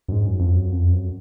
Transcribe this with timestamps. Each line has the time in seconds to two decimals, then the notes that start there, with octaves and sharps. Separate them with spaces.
0.08 F#2
0.12 G#2
0.26 F#2
0.39 F2
0.52 F#2
0.72 F2
0.92 F#2